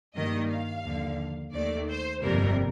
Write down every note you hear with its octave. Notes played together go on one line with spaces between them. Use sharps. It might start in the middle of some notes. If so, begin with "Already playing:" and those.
G2 D#3 G3 A#3 D#5
F5
D#2 D3 F3 A#3
D#2 D#3 A3 D5
C5
G1 F2 C3 G3 A#3 A#4